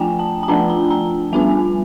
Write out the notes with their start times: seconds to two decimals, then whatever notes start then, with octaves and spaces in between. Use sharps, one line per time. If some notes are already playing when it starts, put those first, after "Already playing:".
Already playing: F3 A3 D4 F4 G5 G#5 A#5
0.19 A5
0.43 A5
0.48 F3 A3 D4 F4 A#5
0.70 A#5
0.90 A#5
1.33 G3 B3 D4 F4 G#5